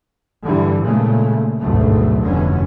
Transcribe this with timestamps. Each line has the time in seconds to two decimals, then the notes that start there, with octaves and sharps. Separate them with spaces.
0.43 G2 D3 E3 G3
0.82 A#2 C#3 G#3 A3
1.60 G#1 D2 G2 B2 F#3 A3
2.24 F1 G2 B2 D3 E3 C#4